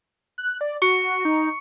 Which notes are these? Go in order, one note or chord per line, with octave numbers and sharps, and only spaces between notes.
F#6
D5
F#4 C#6 C#7
D#4